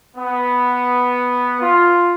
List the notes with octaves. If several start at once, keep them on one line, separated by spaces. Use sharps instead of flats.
B3
F4